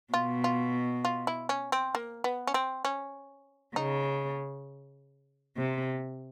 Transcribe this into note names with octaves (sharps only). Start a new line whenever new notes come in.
B2 F4
F4
F4
E4
C#4
C4
A#3
B3
C#4
C4
C#4
C#3 D#4
C3